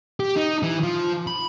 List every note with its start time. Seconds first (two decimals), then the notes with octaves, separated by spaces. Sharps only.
0.20 G4
0.37 D#4
0.63 E3
0.83 F3
1.27 B5